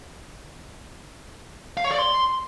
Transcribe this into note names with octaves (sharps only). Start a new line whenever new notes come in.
F5
C#5
D5
C6